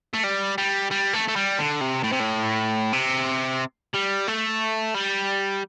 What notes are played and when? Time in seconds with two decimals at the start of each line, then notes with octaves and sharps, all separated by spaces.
0.14 A3
0.24 G3
0.58 G3
0.91 G3
1.14 A3
1.28 A3
1.36 G3
1.59 D3
1.81 C3
2.03 A2
2.12 C3
2.20 A2
2.93 C3
3.94 G3
4.27 A3
4.94 G3